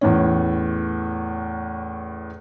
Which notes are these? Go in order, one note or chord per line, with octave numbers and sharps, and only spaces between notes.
E2 A2 C#4